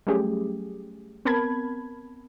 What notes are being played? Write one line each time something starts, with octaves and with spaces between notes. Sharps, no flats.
F#3 G3 A3 C#4 G4 G#4
B3 C4 A#4 A5 B5 G#6